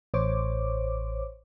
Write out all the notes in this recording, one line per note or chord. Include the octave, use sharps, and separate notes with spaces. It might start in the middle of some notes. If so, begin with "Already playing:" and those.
A1 C5 C#5 D6